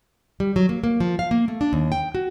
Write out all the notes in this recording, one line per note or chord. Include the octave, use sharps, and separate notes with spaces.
G3
F#3
A#3
A#3
F3
F5
A#3
A3
D4
D#2
G5
F#4